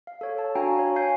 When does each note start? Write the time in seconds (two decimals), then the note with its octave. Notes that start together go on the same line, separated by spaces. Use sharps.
0.07 F5
0.21 A4 C#5
0.38 A5
0.55 D4 F#4 F5 G5 G#5 A#5
0.79 C#5
0.96 F5 G#5 G6 C7